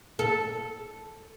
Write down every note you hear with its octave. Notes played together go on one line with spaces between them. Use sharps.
A4